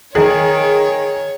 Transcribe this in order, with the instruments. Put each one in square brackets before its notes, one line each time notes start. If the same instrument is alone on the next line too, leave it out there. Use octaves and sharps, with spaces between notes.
[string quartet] D#3 [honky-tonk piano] G#4 [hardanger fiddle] C#5